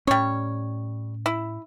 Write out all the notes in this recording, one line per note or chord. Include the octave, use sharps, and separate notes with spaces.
A2 G3 C#4 C#5
E4